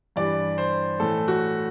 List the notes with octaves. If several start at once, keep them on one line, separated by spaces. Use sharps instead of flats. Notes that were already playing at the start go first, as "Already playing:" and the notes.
G2 E3 G3 D5
C5
A2 E3 A3 A4
F#4